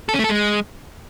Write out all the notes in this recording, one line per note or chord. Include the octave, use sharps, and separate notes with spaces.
A4
C#4
A3
A4
G#3